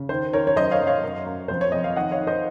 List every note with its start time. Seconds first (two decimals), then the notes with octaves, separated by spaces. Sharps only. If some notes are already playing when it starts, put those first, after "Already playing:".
Already playing: C#3
0.09 D#3 C5
0.33 D#3 A#4 C#5
0.47 C#5
0.56 F#2 C5 D#5
0.71 C#5 F5
0.80 F#2
0.87 C#5 F5
1.03 F#2
1.26 F#2
1.48 F2 C5
1.61 C#5
1.72 F2 D#5
1.84 F5
1.96 D#3 D#5 F#5
2.12 C#5 F5
2.20 D#3
2.27 C5 D#5